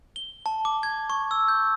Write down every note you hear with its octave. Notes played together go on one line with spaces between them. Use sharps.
G7
A5
D6
G#6
C#6
E6
G6